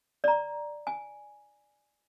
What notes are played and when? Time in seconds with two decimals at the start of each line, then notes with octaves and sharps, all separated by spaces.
0.24 D5 A#5
0.87 G#5